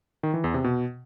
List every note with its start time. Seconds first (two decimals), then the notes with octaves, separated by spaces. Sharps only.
0.23 D#3
0.34 E3
0.44 E2
0.54 C3
0.64 B2